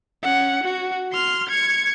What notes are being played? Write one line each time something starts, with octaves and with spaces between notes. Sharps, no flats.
C#4 F#5
F#4
C6 F6
G#6 C#7